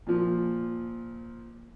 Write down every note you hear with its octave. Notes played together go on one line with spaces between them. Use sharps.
A#2 F3